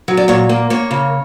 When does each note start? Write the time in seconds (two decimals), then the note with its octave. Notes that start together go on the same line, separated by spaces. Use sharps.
0.08 F#3
0.17 D5
0.28 A#2 C#5
0.49 A#3
0.70 A#3 C#5
0.91 C#3